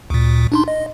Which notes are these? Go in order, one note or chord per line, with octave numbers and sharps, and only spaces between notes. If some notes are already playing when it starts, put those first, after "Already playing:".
D2 A#2
D4 D#4 C6
D#5